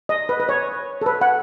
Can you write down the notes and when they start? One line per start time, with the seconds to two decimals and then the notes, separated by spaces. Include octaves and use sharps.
0.09 D#5
0.29 B4
0.40 B4
0.49 C#5
1.01 A4
1.06 B4
1.21 F#5